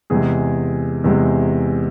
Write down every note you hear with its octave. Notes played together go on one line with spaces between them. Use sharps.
E2 C3 G#3 G#4
E2 C3 G#3